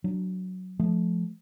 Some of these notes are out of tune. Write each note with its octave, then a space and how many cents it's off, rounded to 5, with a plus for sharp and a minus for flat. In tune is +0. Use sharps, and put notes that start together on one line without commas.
F#3 +0 D4 +0
F3 +0 A3 -30